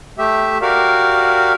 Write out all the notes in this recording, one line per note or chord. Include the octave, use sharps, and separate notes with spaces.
A3 G4 E5
F#4 G4 A#4 D5 F5